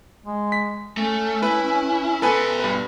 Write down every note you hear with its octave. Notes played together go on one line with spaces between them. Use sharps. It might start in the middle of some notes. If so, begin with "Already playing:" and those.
G#3
B6
A3 C#4
E4 B4
B2 A4 B4 G#5 C6
G2 B4